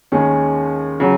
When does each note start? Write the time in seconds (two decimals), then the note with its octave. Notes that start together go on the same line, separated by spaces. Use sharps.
0.12 D#2 D#3 G#3 C#4 G#4
1.00 C#3 F#3